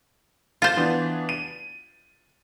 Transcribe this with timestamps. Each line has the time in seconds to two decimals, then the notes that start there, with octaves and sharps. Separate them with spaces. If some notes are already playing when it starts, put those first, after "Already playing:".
0.62 F4 C5 A6
0.77 E3 B3 D4
1.29 D#7